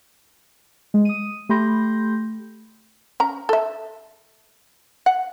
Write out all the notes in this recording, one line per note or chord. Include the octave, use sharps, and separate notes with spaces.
G#3
D#6 D#7
A3 G4 B5 C6 G6 A#6
C#4 A#5
A4 E5
F#5